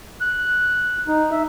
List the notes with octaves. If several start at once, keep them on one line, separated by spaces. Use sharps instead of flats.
F#6
D#4
E5